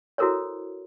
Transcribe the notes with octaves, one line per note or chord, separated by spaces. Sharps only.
E4 F#4 A4 A#4 C5 C#5